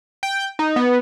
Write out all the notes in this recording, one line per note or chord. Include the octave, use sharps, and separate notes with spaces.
G5
D#4
B3